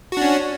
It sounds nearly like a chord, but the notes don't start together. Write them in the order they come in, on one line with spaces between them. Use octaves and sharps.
F#4 D4 C#4